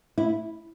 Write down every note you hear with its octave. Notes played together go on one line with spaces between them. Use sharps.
E4